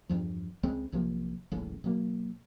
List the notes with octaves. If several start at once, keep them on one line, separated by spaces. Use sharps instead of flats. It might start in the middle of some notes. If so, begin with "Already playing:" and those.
E2 G2 F3
C#2 C#3 G#3 C4
B1 C3 F3 A#3
D#1 A#1 A2 C#3
B2 F#3 A#3